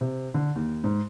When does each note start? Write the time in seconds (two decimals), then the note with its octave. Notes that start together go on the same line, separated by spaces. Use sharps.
0.01 C3
0.34 D3
0.56 D#2
0.84 G#2